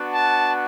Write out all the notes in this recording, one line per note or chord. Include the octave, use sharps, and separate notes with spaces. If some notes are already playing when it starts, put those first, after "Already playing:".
Already playing: B3 D4 F#4
A5